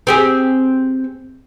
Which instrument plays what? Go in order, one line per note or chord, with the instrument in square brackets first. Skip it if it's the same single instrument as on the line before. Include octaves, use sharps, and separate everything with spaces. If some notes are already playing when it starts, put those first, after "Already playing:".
[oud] C4 G4 G#4